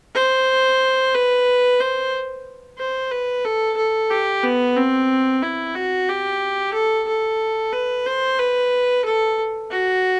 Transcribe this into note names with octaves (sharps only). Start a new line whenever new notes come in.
C5
B4
C5
C5
B4
A4
A4
G4
B3
C4
E4
F#4
G4
A4
A4
B4
C5
B4
A4
F#4